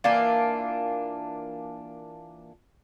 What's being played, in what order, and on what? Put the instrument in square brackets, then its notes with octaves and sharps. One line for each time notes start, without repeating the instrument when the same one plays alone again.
[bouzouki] E3 A#3 D4 F4